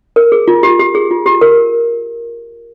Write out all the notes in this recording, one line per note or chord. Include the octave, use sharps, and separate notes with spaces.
A#4
G#4
F4
G4
G4
G#4
F4
G4
A#4